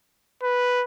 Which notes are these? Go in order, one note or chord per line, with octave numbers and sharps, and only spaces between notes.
B4